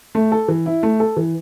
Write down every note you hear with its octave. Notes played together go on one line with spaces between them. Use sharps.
A3
A4
E3
E4
A3
A4
E3